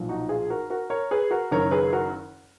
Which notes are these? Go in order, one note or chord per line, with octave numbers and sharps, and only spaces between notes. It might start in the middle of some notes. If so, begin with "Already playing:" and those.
Already playing: B1 A#2 F3
D#4 F#4
F4 G#4
F#4 A#4
F#4 A#4
A#4 C#5
G#4 B4
F#4 A#4
F#1 F#2 D#3 A#4 C#5
G#4 B4
F#4 A#4